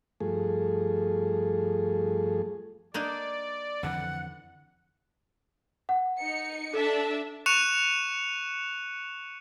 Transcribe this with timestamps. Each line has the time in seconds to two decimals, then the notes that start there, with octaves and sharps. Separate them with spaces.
0.20 G2 F3 A3 G#4
2.94 A#3 D4 D#4 D5
3.83 F2 D3 E3 F#5
5.89 F#5
6.19 D#4 C#7
6.73 D4 A4 E5 A5
7.46 C#6 F#6 C#7 E7 F7